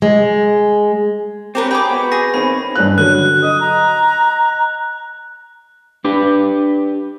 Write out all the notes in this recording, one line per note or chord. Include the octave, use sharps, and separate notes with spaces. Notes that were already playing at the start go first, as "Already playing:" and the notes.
G#3
C4 C#4 G4 A#4 B4
G4 G#4 G5 G#5 B5 D6
B3 F#4
G#4 A#6
D#3 C4 C#4 B5
G2 C#4 F#6
D3 F#3 F#6
D#5 D#6
A#5
D4 G4 B4